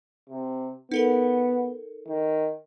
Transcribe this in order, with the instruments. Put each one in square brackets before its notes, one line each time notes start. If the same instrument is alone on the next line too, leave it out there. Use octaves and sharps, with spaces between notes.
[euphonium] C3
[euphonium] B3 [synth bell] D#4 A4 A#4
[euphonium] D#3